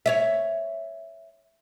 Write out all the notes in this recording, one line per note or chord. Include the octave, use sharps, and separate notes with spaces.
C#5 D5 E5